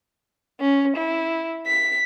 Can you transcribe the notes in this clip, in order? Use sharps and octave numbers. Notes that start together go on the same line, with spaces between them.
C#4
E4
B6